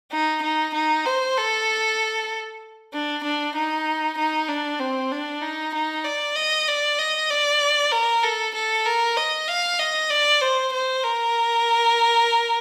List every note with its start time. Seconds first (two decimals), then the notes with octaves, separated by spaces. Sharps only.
0.12 D#4
0.43 D#4
0.74 D#4
1.05 C5
1.37 A4
2.93 D4
3.24 D4
3.55 D#4
4.18 D#4
4.48 D4
4.80 C4
5.11 D4
5.42 D#4
5.74 D#4
6.04 D5
6.36 D#5
6.68 D5
6.99 D#5
7.30 D5
7.91 A#4
8.23 A4
8.54 A4
8.86 A#4
9.16 D#5
9.47 F5
9.79 D#5
10.10 D5
10.41 C5
10.73 C5
11.04 A#4